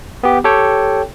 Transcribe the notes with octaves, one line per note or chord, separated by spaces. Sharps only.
B3 G4
G4 A4 C#5 G5